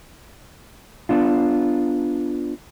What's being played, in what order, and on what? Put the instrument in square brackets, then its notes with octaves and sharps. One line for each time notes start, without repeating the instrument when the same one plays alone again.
[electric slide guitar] B3 D4 F4